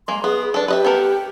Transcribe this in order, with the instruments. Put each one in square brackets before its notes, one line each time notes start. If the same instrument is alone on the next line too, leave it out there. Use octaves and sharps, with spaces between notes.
[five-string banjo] G#3 A#3 [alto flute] C6
[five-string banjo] B3 [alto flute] G#4
[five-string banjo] D4 A4 [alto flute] B4
[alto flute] G4 [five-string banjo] B4 D#5 E5
[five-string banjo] B3 A4 A#4